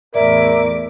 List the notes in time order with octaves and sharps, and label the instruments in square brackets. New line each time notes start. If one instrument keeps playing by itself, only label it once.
[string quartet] E2 A2 D6 [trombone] A#4 [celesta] D5 [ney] E5